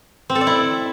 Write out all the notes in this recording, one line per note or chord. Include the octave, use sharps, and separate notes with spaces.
C4
A4
D5
E4